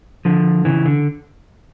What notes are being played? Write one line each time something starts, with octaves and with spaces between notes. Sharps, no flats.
D3 F3
C#3 E3
D3